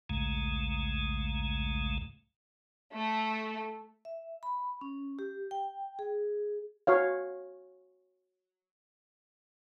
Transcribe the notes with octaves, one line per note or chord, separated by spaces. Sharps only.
A#1 D#2 G#2 C#3 G#3 A3
A3
E5
B5
C#4
G4
G5
G#4
F#4 C#5 F5